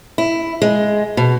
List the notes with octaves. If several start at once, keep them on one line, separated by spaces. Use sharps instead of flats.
E4
G#3
B2